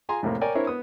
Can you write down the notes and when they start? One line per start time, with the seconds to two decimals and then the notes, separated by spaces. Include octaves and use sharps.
0.09 F4 G#4 G#5 A#5 C6
0.23 F2 A2 C3 A#3
0.41 A#4 C#5 D5 G5 G#5
0.55 C4 D4 E4 A#4 C5 C#5
0.67 B3 D#6